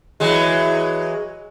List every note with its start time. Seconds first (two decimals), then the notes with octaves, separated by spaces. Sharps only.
0.20 E3 F#3 G#3